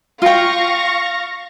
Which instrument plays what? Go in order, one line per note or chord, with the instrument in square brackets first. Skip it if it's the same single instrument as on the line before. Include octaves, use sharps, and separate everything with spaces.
[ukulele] F4 G5 [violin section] F5 C#6 A#6